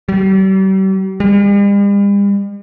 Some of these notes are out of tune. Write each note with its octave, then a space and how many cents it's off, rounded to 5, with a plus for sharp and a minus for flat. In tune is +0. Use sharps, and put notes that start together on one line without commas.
G3 -40
G3 +45